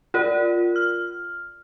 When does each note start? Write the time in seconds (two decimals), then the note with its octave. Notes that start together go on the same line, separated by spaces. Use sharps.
0.14 F4 A#4 D5
0.76 F6